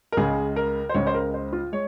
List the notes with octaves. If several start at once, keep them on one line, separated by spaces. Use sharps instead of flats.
A#4
C#2 C#3 G#3 G#4
A#4
C5
C#2 C#3 G#3 C#5
C5
A#4
C5
F4
G#3 C#5